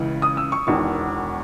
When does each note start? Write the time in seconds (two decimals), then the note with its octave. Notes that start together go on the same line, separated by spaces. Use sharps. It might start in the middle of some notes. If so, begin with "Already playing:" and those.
Already playing: C#2 C#3 E3
0.22 D#6
0.37 E6
0.52 C#6
0.67 E1 E2 D#3 C#6